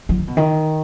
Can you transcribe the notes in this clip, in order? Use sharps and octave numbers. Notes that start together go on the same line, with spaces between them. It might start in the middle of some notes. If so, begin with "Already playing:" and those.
F3
D#3
B2
D#3